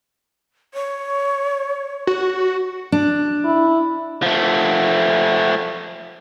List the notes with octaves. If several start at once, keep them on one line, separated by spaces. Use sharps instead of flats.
C#5
F#4
D4
E4
F3 A3